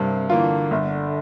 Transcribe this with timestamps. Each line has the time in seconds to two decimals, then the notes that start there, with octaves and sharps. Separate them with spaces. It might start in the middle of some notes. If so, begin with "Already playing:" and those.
Already playing: G2 C3 A#3
0.29 D3 E3 A#3 F4
0.71 G1